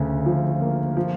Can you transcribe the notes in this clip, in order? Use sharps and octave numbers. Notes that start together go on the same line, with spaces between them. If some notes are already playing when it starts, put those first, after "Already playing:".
Already playing: D2 C#3
F3
A#3
F3